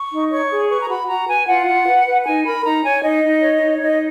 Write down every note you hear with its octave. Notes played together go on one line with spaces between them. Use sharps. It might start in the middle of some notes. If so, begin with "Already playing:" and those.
Already playing: C#6
D#4
C#5 C#6
G#4
B4 C#6
A#5
F#4 B5
F#4 A#5
B4 G#5
F4 F#5
F4
B4
B4
D#4 G#5
A#4 B5
D#4 A#5
C#5 G#5
D#4 D#5
D#4
C#5
D#4
D#4 D#5